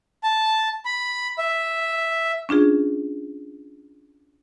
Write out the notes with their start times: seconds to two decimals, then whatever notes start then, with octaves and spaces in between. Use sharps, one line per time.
0.23 A5
0.85 B5
1.38 E5
2.49 C#4 D4 F4 G#4